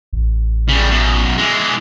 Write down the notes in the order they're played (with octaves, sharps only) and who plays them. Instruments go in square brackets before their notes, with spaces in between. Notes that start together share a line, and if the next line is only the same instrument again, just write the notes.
[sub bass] A1
[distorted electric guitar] C#3 G3
F#2 B2
E3 G#3